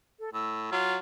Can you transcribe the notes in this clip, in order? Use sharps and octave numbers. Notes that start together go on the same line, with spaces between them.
A4
A2 E6
F#3 F4